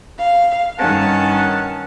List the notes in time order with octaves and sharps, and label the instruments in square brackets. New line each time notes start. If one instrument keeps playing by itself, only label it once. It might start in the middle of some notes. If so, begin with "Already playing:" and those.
[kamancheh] F5
[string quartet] G2 D#3 C#4 [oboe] F#5 [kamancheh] A5